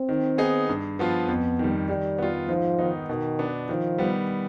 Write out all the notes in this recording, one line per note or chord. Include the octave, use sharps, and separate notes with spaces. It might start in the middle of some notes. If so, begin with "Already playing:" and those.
Already playing: C4
D#3
B3 D#4 G#4
G2
F3 B3 F4
F2 B3
D#3 G3
D#3 G3
B3 F4
G#2 F3
D#3 B3 D#4
B2 D#3
B3 D4
D#3 F3
G3 B3